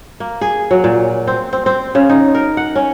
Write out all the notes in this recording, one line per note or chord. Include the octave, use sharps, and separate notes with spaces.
A#3
G#4
F#3
A#2
C4
C4
C4
C#3
D#4
A#4
F#5
C#4